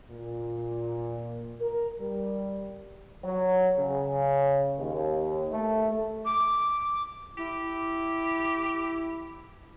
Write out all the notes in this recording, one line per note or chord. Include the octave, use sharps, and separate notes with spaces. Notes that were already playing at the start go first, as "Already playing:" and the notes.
A#2
A#4
G3
F#3
C#3
D#2
A3
D6
E4 G4